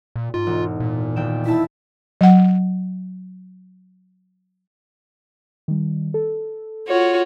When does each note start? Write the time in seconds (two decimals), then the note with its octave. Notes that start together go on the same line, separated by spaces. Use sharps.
0.16 A#2
0.34 G#2 F4
0.46 E1
0.80 A#2
1.16 D#1 G5 E7
1.46 E4 A5 B6
2.21 F#3 F#5
5.68 D#3 G3
6.14 A4
6.88 F4 F#4 C#5